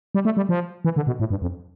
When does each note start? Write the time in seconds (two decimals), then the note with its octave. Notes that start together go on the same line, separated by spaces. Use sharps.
0.15 G3
0.25 A3
0.37 G3
0.49 F3
0.85 E3
0.96 D3
1.07 B2
1.20 A2
1.30 G2
1.42 F2